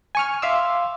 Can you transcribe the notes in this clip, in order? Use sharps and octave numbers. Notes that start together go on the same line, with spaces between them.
G#5 C#6 F6
E5 F5 C6 D6 E6